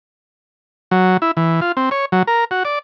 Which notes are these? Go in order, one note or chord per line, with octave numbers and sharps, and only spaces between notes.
F#3
E4
E3
F4
C4
C#5
F#3
A#4
F#4
D5